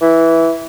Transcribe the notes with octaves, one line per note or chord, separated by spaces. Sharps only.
E3